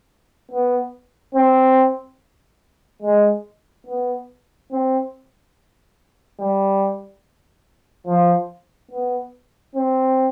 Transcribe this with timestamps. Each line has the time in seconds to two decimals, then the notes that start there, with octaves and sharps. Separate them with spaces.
0.51 B3
1.34 C4
3.02 G#3
3.86 B3
4.71 C4
6.39 G3
8.07 F3
8.91 B3
9.75 C4